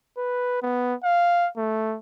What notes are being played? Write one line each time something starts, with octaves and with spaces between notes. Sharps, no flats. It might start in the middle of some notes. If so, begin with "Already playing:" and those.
B4
B3
F5
A3